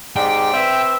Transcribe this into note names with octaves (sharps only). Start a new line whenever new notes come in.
G#2 C3 D5 G5
C4 B4 E5